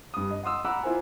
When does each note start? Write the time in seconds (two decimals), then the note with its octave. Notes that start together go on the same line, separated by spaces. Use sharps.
0.14 G2 D#6
0.31 D#5
0.43 F#5 C6 D#6 E6
0.65 F#5 A#5 B5 D6 E6 F#6
0.83 E4 F4 A#4 C5 G#5